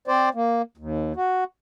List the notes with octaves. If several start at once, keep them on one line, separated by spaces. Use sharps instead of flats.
C4 C5 D5
A#3
D#2
F#4